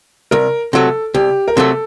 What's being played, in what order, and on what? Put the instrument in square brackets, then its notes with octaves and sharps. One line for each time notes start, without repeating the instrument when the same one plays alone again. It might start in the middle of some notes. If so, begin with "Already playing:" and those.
[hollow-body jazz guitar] C2 [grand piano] A#4
[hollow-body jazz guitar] C3 F#3 A3 [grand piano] A4
[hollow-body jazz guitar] C2 [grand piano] G4
[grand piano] A#4
[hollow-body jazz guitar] C3 F#3 A3 [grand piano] A4